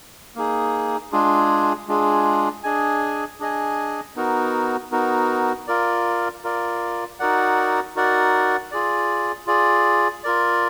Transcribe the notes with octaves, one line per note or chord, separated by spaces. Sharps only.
A#3 D#4 G#4
G#3 D4 F4 G#4
G#3 D4 F4 G#4
D4 G#4 D#5 G#5
D4 G#4 D#5 G#5
B3 D#4 F#4 A#4
B3 D#4 F#4 A#4
F4 A#4 D5
F4 A#4 D5
D#4 F#4 A#4 D5 F#5
D#4 F#4 A#4 D5 F#5
F4 G#4 D5
F4 G#4 D5
F4 A#4 D5